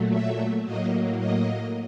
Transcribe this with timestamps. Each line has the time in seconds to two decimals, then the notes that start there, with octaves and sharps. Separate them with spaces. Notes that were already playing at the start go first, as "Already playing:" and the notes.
Already playing: A#2 F#3 A3
0.11 E5
0.65 A2 F#3 A#3 D#5
1.19 D#5